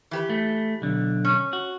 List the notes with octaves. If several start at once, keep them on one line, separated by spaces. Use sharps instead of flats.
E3 G4 B4
A3
B1 D3
C#4
F#4